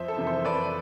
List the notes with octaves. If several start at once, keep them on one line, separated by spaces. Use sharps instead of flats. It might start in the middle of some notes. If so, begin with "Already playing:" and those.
Already playing: F2 C5 E5
A4
C3 E3
A4 C5
F2 B4 D5